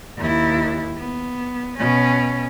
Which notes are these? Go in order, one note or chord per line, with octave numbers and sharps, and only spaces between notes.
D#2 E4
B3
B2 C#4